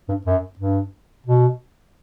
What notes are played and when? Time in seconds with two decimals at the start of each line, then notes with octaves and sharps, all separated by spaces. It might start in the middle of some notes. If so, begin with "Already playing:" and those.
0.09 G2
0.26 F#2
0.59 G2
1.26 B2